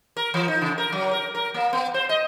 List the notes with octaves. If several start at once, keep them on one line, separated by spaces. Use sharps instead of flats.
A#4
E3
D#4
C#3
A#4
F#3
A#4
A#4
A#3
B3
C5
D#5